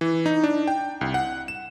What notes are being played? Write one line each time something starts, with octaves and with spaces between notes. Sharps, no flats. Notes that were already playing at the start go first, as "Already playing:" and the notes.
E3
D#4
D4
G5
C2
F#5
E7